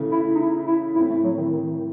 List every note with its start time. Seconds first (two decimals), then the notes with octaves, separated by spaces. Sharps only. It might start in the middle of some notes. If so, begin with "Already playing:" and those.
Already playing: C#3 E3 A3
0.11 E4
0.35 D#4
0.39 E4
0.67 E4
0.95 A2 E3 C4 E4
1.09 A3
1.24 F#3
1.37 D#3
1.51 D#3